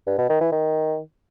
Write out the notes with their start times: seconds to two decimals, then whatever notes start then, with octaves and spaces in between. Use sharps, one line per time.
0.07 G2
0.18 B2
0.29 D#3
0.40 E3
0.52 D#3